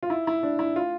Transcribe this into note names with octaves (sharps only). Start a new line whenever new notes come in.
F4
E4
E4
D4
E4
F4